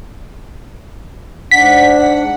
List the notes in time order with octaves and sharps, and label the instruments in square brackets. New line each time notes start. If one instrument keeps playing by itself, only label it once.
[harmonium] G#2 D4 [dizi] F#5 [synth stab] B6
[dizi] F#5